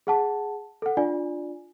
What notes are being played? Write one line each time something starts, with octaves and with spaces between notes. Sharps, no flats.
G#4 F#5 A5
A4 F#5
D4 F4 D5 G#5